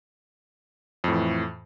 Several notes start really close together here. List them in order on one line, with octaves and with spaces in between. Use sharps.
F2 A2 E3